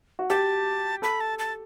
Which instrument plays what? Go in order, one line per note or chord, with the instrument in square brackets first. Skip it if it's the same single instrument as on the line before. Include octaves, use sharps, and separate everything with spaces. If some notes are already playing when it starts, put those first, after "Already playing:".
[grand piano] F#4
[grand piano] G4 [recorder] A5
[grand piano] A4 [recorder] B5
[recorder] A5
A5